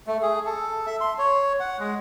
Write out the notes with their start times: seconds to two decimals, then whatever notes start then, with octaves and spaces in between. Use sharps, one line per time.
0.07 A3
0.23 G#4
0.45 A4
0.87 E5
1.01 C6
1.18 C#5
1.60 F#5
1.80 G#3